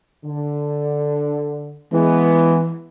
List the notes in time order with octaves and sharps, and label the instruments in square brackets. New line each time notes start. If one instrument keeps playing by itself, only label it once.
[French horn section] D3
[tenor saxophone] E3 [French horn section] G#3 B3